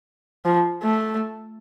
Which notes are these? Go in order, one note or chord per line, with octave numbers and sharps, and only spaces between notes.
F3
A3